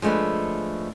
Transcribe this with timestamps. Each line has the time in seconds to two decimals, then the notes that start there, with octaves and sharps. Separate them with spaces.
0.02 F3 G#3 A3 D4 B4